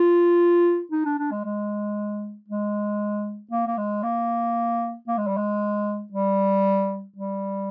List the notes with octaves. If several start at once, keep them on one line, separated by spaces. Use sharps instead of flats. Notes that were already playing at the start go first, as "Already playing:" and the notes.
Already playing: F4
D#4
D4
D4
G#3
G#3
G#3
A#3
A#3
G#3
A#3
A#3
G#3
G3
G#3
G3
G3